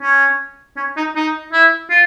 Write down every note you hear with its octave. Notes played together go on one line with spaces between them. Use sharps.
C#4
C#4
D#4
D#4
E4
F4